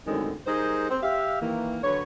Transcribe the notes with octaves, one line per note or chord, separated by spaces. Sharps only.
F#2 A2 D3 D#3 G#3 C4
G3 D#4 G#4 A#4 C5
C4
G4 E5 F5
D#3 E3 A#3
D3 F#3 B4 C#5